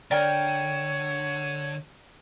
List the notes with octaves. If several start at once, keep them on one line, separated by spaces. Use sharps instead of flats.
D3 A#4 C#5 D5 G5 F6